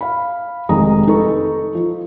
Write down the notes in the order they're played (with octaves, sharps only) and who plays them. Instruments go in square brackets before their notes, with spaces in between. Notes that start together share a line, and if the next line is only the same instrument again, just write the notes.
[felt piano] F5 B5
F1 D#3 G#3 A#5 D#6
D#4 A4 B4 C#6
F3